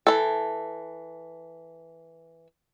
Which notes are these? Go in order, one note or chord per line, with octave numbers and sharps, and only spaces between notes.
E3 A4